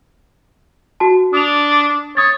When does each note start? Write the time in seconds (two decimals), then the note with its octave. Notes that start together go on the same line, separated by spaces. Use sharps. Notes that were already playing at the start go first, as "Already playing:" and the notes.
1.00 F#4 A5
1.33 D4 D#6 F7
2.17 C#5 D#6 A6